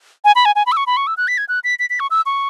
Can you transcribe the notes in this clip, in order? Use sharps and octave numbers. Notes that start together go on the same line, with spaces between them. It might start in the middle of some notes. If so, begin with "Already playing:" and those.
G#5
B5
G#5
G#5
B5
E6
C#6
B5
C#6
E6
F#6
B6
G#6
F#6
B6
B6
B6
C#6
E6
C#6